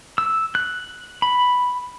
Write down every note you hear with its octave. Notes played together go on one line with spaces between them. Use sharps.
E6
F#6
B5